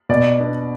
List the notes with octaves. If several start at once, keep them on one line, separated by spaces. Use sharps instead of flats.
B2 D5
B3 D4